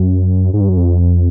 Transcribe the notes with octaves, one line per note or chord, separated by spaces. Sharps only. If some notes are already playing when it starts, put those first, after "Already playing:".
Already playing: F#2
G#2
G2
F#2
F2